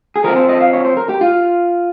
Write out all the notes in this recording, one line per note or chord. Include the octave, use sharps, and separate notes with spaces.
G#4
F3 C4 A#4
C5
D#5
F5
C#5
C5
A#4
G4
F4